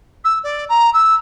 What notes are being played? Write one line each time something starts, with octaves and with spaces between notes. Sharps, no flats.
E6
D5
A#5
E6